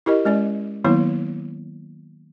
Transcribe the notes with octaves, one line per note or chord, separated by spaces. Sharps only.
E4 G4 A#4 D#5
G#3 C#4 D5
D#3 F#3 A#3 B3 E4 C#5